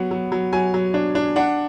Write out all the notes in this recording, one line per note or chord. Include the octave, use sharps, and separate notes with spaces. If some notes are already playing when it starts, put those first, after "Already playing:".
Already playing: F#3 B3 F#5
F#3
F#3
F#3 G#5
F#3
D4
D4
D4 F#5